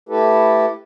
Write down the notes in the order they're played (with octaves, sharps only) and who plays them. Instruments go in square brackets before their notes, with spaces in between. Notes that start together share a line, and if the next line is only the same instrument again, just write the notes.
[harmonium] A3 E4 G4 A4 B4